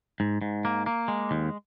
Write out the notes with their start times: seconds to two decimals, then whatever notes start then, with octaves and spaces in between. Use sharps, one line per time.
0.20 G#2
0.42 G#2
0.65 A#3
0.86 A#3
1.08 G#3
1.31 D#2